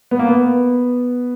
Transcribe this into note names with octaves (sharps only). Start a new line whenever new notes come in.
B3
A#3
B3